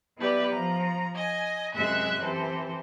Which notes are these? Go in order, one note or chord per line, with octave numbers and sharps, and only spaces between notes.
F#3 B3 E4 G4 B4 D5
F3 A#5
D#5 G#5
F#2 C3 G#3 E5 F#6
E3 C4 G4 A4 C5